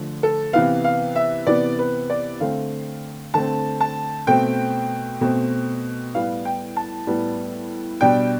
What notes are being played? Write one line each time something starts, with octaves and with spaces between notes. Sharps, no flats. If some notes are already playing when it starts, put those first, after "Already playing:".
Already playing: D3 F3 A3
A4
C3 E3 B3 F5
F5
E5
C3 E3 B3 D5
B4
D5
D3 A3 C4 F5
D3 A3 C4 A5
A5
B2 A3 C4 G5
B2 A3 C4
A2 G3 B3 F5
G5
A5
A2 G3 B3
B2 G3 D4 G5